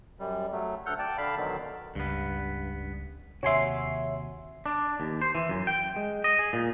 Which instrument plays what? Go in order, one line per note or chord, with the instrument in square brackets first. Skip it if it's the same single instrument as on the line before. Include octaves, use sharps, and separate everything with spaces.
[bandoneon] F#2 G3
F#3 A3
D2 A4 F#5 F6 G6
D5 G5 A5
D3 F5 A5 B5
B2 D3 D#3 F#3
[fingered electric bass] C#2 [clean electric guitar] G2 B3
[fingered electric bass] D#2 C3 [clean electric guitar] F#4 G#5 C6 [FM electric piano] C#5 E5
[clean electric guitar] D4
D#2
C5
E3
F#2
G5
G#3
D#5
G#4
A#2